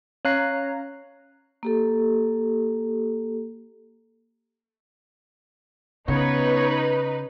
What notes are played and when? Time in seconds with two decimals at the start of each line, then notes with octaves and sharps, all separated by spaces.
0.25 C#4 C#5 F5 A#5 F#6 C7
1.63 A#3 G4 A4
6.08 C#3 B3 D#4 B4 C#5